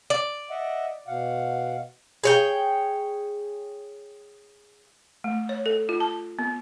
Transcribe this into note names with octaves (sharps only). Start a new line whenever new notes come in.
D5
D#5 E5 F#5
B2 F5 F#5
G#4 C#5 G5
A3
C#5
A4
F4
A5
B3